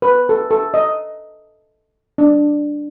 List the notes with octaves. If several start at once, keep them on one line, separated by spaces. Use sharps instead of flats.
B4
A4
A4
D#5
D4